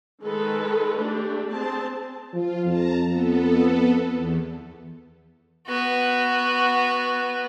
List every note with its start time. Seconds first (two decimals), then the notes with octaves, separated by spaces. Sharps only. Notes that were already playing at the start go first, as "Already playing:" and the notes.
0.22 D#3 G#3 A4 B4
0.97 A3 D4 G4
1.52 C4 G#4 A5
2.33 F3 F4
2.66 F2 A5 A#5
3.08 F2 B3 A4
4.11 E2
5.67 B3 F#4